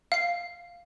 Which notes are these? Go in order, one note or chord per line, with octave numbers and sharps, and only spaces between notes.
F5 C7